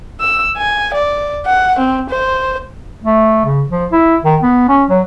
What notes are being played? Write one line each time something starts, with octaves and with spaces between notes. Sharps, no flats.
E6
G#5
D5
F#5
C4
C5
A3
C#3
F3
E4
D#3
B3
C#4
F#3